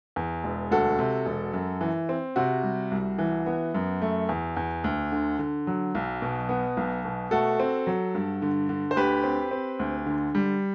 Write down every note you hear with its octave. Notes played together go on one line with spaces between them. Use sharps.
E2
E1
D2 F#4 A4
C3
E1
F#2
E3
C4
C3 F#4
G3
C2
E3
B3
F#2
A3
E2
E2
D2
D3
D3
F#3
B1
B2
B3
B1
B2
A3 F#4 A4
C4
F#3
G2
D3
D3
C5
D2 G4 B4
C4
C4
D2
D3
G3